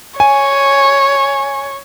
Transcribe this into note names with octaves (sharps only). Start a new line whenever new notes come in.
C#5 G#5